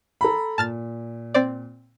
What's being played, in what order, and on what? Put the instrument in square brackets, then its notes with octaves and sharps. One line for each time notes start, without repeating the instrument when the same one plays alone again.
[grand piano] A4 A#5 B5
[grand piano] A#2 [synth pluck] A5 F6 A6
[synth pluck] C4 C5 D5